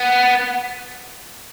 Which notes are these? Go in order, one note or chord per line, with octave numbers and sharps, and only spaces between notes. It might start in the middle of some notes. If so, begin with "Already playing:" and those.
Already playing: B3